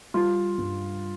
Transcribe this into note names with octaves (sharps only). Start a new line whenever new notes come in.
G3 F4
G2